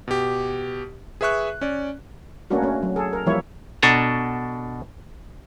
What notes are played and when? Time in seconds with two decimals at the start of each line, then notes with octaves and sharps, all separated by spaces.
0.08 B2 G4
1.21 G#4 B4 E5 C#6 F#6
1.61 C#4 D5
2.50 A3 A#3 C#4 D4 F#4
2.62 A3 C#4
2.83 F#3
2.96 G#4 A4
3.13 A#4
3.26 E3 F3 G3 A#3 E4 C#5
3.83 B2 D4 A4 G#5 A#5